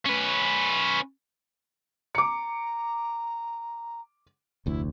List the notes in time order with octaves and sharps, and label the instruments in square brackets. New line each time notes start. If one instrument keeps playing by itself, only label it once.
[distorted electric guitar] C#4 B4
[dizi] A#5 [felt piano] D6 C#7
[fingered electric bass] F1 D2 [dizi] E4